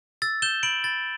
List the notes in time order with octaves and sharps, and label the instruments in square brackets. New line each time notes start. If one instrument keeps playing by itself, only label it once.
[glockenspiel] E6 A6
G6 E7 G7
B5 D7 F#7
B5 A6